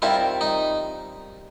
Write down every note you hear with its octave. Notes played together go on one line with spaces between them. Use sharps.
D#3 G3 C4 E4 F4 A#4
D#4